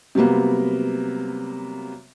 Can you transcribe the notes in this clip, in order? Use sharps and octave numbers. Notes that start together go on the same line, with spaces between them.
C3 F#3 G3 A#3 B3